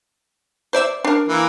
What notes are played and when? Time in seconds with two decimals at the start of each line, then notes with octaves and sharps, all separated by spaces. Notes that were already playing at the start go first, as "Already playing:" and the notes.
0.73 C5 D5 E5
1.04 D4 A#4
1.29 E3 A#3